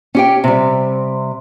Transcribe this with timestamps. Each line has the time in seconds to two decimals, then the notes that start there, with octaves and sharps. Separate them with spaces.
0.15 C#4 G4 G5
0.44 C3 G3